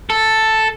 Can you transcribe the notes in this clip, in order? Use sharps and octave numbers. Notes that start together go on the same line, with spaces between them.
A4